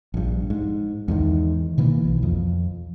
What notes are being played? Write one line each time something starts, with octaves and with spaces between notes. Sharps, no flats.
A#1 G2
G#2
E2 G#2 D#3
B2 D#3 E3 A#3
B1
F2